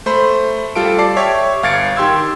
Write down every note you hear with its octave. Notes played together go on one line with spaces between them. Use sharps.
A3 C5 B5
G3 F4 A4 D7
D5 A5 D6 C7
G4 C#5 E5
G1 F5 G#6 A6 C#7 D7
D#3 G4 C6 E6 G#6